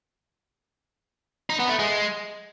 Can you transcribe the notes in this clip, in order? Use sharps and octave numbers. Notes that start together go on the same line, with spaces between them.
D#4
B3
A3
G#3